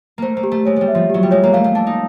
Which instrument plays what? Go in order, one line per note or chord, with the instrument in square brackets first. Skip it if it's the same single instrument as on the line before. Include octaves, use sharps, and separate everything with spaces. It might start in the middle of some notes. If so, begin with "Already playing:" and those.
[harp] A3 A#3 [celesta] C5
[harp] A#3
[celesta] G4
[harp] A3
[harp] G#3 [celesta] C#5
[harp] G3 G#3
[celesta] E5
[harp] F3
[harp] F#3 [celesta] G4
[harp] G3
[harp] G#3 [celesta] C#5
[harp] A#3
[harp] A3 [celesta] F5
[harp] A3
[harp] D4 [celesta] A5
[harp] D#4